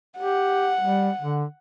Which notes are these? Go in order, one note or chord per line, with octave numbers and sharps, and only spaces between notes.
G4 F#5
G3
D3